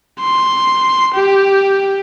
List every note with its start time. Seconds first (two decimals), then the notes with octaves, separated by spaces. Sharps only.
0.20 C6
1.14 G4